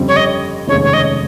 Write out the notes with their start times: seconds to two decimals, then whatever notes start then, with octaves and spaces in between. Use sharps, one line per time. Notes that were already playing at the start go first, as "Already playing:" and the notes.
Already playing: G1 F2 C#3 G3 C4
0.08 C#5
0.16 D#5
0.68 F1 D#2 C#3 G#3 C#5
0.84 C#5
0.93 D#5